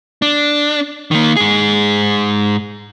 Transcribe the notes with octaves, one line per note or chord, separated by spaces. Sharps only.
D4
D#3 A#3
G#2 G#4